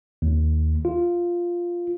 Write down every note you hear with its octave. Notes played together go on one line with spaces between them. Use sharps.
D#2
F4